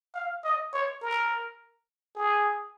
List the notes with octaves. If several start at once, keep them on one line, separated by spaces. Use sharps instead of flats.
F5
D#5
C#5
A#4
G#4